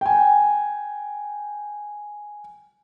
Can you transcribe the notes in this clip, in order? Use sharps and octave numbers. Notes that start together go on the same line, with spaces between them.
G5 G#5